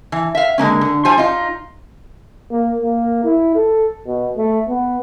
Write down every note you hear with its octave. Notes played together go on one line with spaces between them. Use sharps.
E3
E5 F5
D3 G#3 A#3 C#4
D3
F3 G3 C5 G#5
D#4 F4
A#3
A#3
E4
A4
B2
A3
B3